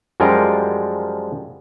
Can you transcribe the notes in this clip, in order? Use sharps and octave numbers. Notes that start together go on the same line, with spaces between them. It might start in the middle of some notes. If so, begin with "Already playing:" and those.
F#2 F3 G3 G#3 F4 A#4